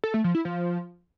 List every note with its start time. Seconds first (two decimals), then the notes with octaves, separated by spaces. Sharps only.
0.04 A4
0.14 A3
0.24 F3
0.35 E4
0.45 F3